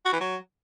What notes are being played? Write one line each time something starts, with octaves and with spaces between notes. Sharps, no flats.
F#4
E3
F#3